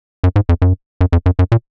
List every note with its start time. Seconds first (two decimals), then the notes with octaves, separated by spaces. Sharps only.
0.24 F#2
0.36 G#2
0.49 F2
0.62 F#2
1.01 F#2
1.13 F2
1.26 F#2
1.39 F#2
1.52 A#2